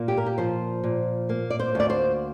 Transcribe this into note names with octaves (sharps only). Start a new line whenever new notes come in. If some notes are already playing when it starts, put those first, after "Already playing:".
Already playing: A#2 A#3
G4
A#4
G4
F3 C5
A#2
A#3
D5
C5
D2 D5
C5